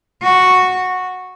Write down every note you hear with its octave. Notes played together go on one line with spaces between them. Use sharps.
F#4